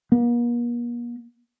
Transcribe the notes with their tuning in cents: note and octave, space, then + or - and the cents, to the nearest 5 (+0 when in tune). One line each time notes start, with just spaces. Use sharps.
A#3 +45